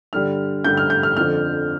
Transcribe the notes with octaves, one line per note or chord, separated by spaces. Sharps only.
G2 D3 G3 F6
G2 D3 G3 G6
F6
G6
F6
F2 D3 F3 F6